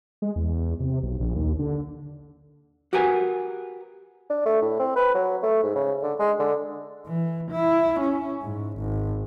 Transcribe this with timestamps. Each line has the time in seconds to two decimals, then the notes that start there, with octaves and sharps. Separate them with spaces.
0.22 G#3
0.36 E2
0.80 C3
1.03 B1
1.20 A#1
1.35 D#2
1.59 D3
2.93 F#4 G4 A#4 B4 G#5
4.30 D4
4.46 A3
4.62 A2
4.79 C4
4.96 B4
5.15 F#3
5.43 A3
5.63 G#2
5.75 C#3
6.03 D3
6.19 G#3
6.39 D3
7.06 E3
7.51 E4
8.00 C#4
8.42 G#2
8.78 G#1